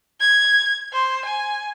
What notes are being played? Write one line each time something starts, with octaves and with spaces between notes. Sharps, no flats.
G#6
C5
G#5